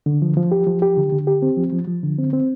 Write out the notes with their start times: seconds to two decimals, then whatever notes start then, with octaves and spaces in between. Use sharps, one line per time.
0.06 D3
0.22 F3
0.37 F3
0.52 G4
0.67 F3
0.82 G4
0.97 D3
1.12 D3
1.27 G4
1.42 C4
1.57 F3
1.73 F3
1.87 F3
2.03 D3
2.18 C4
2.33 C4